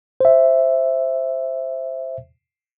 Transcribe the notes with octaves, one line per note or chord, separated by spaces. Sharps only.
C5 E5